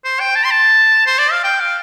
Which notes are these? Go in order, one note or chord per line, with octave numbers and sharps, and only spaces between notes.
C5
G5
A5
C6
A5
C5
D5
F5
G5
F5